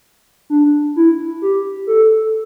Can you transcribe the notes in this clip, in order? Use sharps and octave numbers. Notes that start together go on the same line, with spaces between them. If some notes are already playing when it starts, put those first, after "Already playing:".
D4
E4
G4
A4